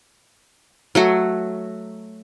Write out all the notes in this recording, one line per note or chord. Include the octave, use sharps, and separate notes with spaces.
F#3 A3 F#4